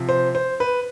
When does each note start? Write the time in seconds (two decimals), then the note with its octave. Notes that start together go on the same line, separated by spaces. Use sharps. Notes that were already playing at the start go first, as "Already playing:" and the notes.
Already playing: C3 F3
0.09 C5
0.35 C5
0.60 B4